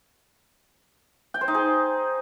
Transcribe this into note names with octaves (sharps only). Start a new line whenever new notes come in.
G5
C5
D#4
G#4